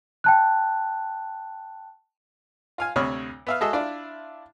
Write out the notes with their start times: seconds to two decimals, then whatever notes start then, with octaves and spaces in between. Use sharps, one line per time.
0.24 G5 A5 F#6
2.78 F4 F5 G#5
2.96 D2 C3 C#5 B5 D#6 F6
3.47 B3 E5 F5
3.61 G#3 F#4 A4 D#5 E5
3.73 D4 E4 F4 D5